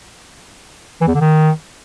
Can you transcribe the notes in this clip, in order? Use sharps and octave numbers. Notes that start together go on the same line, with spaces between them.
E3
E2
D3
D#3